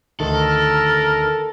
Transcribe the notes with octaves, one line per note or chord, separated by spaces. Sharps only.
D2 D#3 A4
A#4